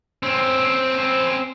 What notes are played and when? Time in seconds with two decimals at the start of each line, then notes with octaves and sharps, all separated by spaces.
0.23 C4 C#4